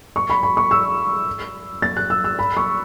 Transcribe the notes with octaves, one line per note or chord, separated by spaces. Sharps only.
C#6
B5
B5
C#6
E6
A6
F#6
E6
E6
B5
C#6